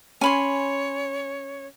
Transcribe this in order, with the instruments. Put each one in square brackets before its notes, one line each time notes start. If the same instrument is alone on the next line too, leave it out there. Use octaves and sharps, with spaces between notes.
[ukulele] C#4 [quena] C#5 [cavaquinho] G#5 B5 C6